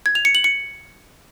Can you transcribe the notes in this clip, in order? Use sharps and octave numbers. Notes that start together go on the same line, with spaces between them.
G#6
F7
C#7
F#7
C#7